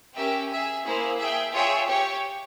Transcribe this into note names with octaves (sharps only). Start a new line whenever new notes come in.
C#4 G4 A#4 E5 G5
G#4 E5 G#5
A#3 E4 G#4 C5
G#4 E5 G5
F4 G#4 C#5 E5 G5
G4 C#5 G5